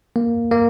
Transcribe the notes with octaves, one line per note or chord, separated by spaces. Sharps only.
A#3
A#3